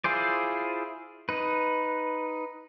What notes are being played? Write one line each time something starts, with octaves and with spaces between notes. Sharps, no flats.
E4 F4 G#4 C5 D5
D#4 B4